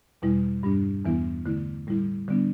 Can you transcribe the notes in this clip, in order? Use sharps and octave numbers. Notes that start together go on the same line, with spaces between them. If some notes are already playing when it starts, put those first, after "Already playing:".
E2 B2 G3 E4
G2 G3 D4
E2 E3 B3 E4
D3 A3 E4
A2 G3 E4
D3 G3 B3 D4